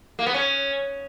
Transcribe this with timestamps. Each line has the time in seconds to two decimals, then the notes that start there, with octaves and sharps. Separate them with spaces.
0.19 A#3
0.27 B3
0.34 C#4